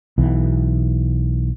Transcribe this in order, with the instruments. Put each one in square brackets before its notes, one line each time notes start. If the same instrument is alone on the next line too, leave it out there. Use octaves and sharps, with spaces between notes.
[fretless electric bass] B1 E3